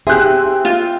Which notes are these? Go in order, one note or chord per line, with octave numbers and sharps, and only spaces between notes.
C4 G4 G#4 E5 G5 F#6
F4